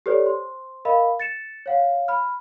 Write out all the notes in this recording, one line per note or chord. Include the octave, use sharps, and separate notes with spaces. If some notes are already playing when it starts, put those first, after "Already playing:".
G4 A4 B4 C#5 D5
C5 C6
A#4 D#5 F5 B5
A6 C#7 E7
C#5 F5 F#5
B5 F6